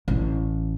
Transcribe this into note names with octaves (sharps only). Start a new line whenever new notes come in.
A1